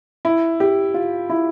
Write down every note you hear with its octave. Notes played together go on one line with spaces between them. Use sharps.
E4
G4
F4
E4